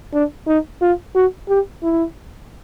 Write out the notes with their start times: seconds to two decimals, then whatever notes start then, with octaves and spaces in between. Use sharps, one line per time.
0.13 D4
0.47 D#4
0.81 F4
1.15 F#4
1.49 G4
1.83 E4